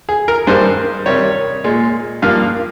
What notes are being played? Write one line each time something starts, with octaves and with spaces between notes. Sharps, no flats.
G#4
A#4
G2 D#3 G#3 C5
C3 D#3 G3 C#5
A#2 G#3
G2 F3 A#3 F5